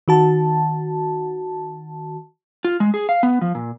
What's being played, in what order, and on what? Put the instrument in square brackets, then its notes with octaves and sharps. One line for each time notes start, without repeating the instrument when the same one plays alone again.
[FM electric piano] D#3 F#4 A5
[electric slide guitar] F4
G#3
G#4
F5
B3
F3
A#2